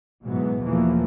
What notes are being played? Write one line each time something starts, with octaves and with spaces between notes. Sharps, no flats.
G#2 B2 E3 F#3 B3
E2 B2 E3 F3 A3 A#3